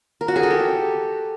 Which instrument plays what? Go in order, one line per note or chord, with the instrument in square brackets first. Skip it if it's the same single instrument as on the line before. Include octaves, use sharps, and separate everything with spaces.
[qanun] A#4
F#4
G#4
A4
G4